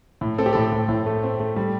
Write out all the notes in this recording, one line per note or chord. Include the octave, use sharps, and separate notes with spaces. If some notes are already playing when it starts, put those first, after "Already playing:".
A2
C4 A4
G4
A2 A4
A2
A2
A3
C4
A3
G3